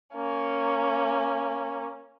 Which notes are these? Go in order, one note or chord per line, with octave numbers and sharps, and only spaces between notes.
A#3 C#4